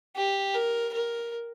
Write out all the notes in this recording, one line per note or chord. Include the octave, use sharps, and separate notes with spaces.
G4
A#4
A#4